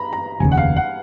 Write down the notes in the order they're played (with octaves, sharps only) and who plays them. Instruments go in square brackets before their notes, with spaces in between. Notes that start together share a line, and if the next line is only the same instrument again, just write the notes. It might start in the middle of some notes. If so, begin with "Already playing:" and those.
Already playing: [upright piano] A#5 B5
A#5
[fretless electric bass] F1 D#2 C#3 [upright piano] G#5
[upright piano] F#5
F5
F#5